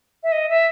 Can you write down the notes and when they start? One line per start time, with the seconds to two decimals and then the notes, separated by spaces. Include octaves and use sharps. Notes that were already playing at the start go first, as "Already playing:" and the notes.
0.23 E5
0.32 D#5
0.49 E5